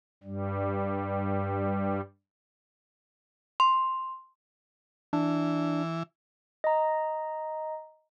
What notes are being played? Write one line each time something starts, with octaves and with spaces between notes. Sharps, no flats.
G2 G3
C6
E3 D4
D#5 A#5